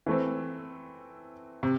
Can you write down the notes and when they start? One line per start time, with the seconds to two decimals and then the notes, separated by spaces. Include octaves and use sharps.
0.06 E3 A3 C4
1.63 C3